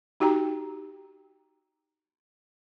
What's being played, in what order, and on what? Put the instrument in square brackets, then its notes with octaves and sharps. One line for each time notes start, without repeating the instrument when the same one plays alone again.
[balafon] D#4 F#4 G4 G5 A#5